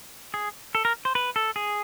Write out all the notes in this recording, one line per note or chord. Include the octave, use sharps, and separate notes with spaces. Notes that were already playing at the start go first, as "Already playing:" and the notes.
G#4
A4
A#4
C5
B4
A4
G#4